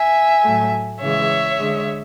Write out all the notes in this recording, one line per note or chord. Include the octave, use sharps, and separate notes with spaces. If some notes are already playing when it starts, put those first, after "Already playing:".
Already playing: E5 G#5
A2 F#3 A3
C#3 E3 G#3 C#5 E5
D3 G#3